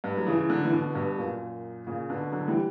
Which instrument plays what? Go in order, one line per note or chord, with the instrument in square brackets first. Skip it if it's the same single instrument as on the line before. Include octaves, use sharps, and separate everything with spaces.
[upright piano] G2
F#3
C#3 E3
D3 F#3
E3
B2 D3
G2 B2
F#2 A#2
A#2 C#3
B2 D3
D3 F#3
E3 G3